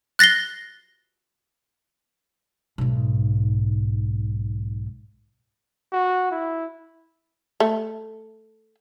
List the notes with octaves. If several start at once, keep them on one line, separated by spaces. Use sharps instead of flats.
F#6 A6 A#6 C7 G7
B1 G#2
F#4
E4
A3